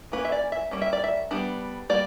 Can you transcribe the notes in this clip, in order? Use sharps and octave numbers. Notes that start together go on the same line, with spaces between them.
E3 A#3 C#4 B4
E5
D5
E5
G3 A#3 C#4
E5
D5
E5
G3 B3 D4
G3 A#3 D5